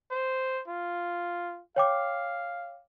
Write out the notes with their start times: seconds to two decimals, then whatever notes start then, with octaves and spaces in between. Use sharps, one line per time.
0.11 C5
0.68 F4
1.76 C#5 F5 G5 D6